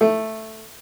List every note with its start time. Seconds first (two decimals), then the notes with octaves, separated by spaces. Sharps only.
0.01 A3